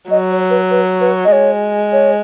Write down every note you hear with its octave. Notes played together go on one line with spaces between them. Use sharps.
F#3 D#5
C#5
B4
B4
B4
D#5
G#3 C#5
C#5